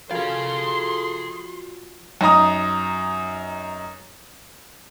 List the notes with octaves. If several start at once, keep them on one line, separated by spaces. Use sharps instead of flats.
F3 F4 F#4 G#4 A4 F5 C6
F#2 D#4 A#5 D#6